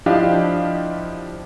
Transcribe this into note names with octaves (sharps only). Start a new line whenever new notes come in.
F3 D4 E4 G4 D#5 F5